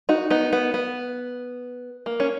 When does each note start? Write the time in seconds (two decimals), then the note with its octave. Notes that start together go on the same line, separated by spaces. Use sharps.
0.09 D#4 F#4
0.30 B3 D#4
0.53 B3
0.74 B3
2.06 A#3
2.20 C#4